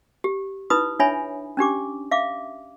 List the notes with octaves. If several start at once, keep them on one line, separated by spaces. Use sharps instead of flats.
G4
D#4 E4 B4 B5 D#6
D4 C#5 E5 G#5 B5
C#4 D4 G4 D6
E5 F5 D6